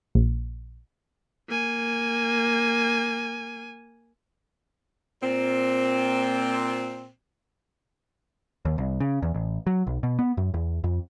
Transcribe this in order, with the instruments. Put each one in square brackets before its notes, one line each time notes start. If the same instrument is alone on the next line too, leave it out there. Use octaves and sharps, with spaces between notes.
[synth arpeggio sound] A#1
[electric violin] A#3 G#5
[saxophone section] A#2 C4
[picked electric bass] D#2
C2
C#3
E2
A1
F#3
B1
B2
B3
F#2
E2
F2